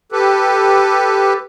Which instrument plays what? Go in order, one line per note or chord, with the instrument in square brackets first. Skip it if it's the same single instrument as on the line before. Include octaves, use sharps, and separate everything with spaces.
[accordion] G4 A4 B4